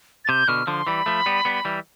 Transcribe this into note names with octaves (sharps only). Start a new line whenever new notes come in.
A6
C3 G6
B2 D3 F6
D3 F3 C6
E3 G3 B5
F3 A3
G3 B3
G3 B3
E3 G3